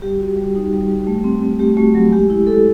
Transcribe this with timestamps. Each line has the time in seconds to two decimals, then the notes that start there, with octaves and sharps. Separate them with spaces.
0.02 G3 G4
0.20 F#4
0.37 G3
0.55 D#4
0.73 G3
0.89 G3
1.07 A3
1.24 C4
1.42 C4
1.59 A3 G4
1.77 A3 F#4
1.95 F#3
2.12 G#3 G4
2.30 E4
2.47 E4 A4